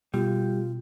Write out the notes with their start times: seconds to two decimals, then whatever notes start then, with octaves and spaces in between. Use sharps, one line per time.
0.14 B2 G3 F4